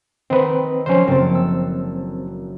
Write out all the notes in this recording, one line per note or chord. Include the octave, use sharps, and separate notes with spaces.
D#3 C4 B4 D#5
F3 F#3 C#4 C5
F#1 C4 A4
E6